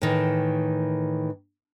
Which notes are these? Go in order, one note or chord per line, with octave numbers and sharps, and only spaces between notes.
A2 D#3 E3